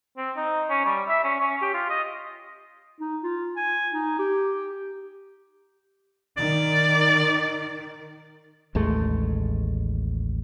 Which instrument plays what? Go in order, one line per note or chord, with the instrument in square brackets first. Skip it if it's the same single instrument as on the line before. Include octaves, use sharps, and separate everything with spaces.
[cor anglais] C4
D#4
C#4
G3
E5
C#4
C#4
G4
F4
D#5
[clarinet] D#4
F4
G#5
D#4
G4
[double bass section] D#3 [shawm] D5
[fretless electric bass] A1 D#2 G#3 A3